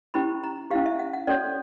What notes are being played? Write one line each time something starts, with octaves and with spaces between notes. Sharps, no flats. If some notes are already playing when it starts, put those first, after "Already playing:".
C#4 E4 G4 B5
A#5
C#4 E4 G4 F5
E5
F#5
F#5
C#4 F#4 A4 C#5 D5